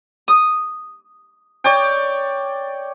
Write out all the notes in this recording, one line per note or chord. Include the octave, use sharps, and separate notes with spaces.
D#6
C#5 D5 G5